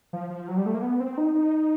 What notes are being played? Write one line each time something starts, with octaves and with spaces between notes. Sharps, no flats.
F3
F3
F#3
G3
A3
A#3
B3
C4
D#4
D#4